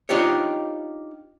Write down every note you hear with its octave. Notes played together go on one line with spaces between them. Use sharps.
D4 D#4 F4 G4 C5 C#5